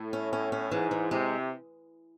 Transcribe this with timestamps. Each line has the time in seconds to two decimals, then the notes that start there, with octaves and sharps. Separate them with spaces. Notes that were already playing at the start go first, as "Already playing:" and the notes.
Already playing: A2
0.13 C#4
0.33 C#4
0.52 C#4
0.71 G#2 E3
0.91 E3
1.11 C3 G#3